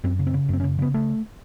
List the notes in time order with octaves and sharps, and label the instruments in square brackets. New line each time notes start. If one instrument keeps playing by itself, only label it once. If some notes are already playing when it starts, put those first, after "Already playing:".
[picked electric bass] F#2 C4
C#3
C4
C#3
F#2 C4
C#4
C#3
C#3 B3
A3